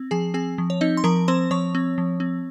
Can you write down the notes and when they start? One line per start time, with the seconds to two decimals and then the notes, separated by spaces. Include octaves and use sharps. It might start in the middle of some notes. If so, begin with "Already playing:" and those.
Already playing: C4
0.11 F3 G#4 G#5
0.34 C4 G#4 G#5
0.58 F3
0.70 C#5
0.81 C4 D#4 D#5
0.97 C6
1.04 F3 A#4 A#5
1.28 C4 C5 C6
1.51 F3 C#5 C#6
1.75 C4
1.98 F3
2.20 C4